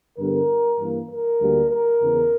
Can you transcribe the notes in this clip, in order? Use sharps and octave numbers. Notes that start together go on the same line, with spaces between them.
G2 D3 G3 B3 A#4
G2 E3 A#3
A#4
D2 D3 G3 A#3
A#4
E2 C#3 E3